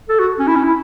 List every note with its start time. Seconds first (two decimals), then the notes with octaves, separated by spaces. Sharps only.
0.09 A4
0.19 F#4
0.39 C#4
0.47 E4
0.56 C#4
0.64 E4